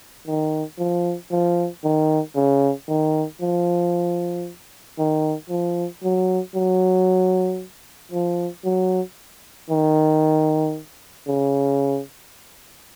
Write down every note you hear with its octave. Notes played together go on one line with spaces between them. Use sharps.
D#3
F3
F3
D#3
C#3
D#3
F3
D#3
F3
F#3
F#3
F3
F#3
D#3
C#3